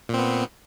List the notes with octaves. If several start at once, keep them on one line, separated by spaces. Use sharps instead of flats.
A#2 B3 C4